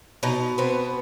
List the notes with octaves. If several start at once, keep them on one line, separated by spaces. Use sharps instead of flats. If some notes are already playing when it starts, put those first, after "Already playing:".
B2 D#4
B3 C4